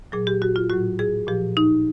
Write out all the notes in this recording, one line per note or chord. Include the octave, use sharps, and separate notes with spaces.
A#2 F#3 G#4
G4
F#4
F4
A2 F#3 F#4
G#4
A#2 F3 G4
D#4